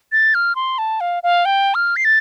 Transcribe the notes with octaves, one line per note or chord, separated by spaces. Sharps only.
A6
F6
C6
A5
F5
F5
G5
F6
C7
A6